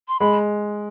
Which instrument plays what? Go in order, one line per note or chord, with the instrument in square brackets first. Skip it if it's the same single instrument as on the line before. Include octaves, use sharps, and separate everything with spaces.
[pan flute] C6
[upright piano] G#3 [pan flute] B5